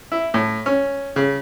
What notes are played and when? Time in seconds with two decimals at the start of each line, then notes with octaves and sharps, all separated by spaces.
0.12 E4
0.34 A2
0.66 C#4
1.16 C#3